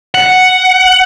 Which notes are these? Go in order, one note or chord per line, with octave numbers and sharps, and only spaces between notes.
F#5